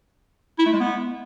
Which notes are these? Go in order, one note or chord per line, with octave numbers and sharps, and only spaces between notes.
E4
A3
G#3
B3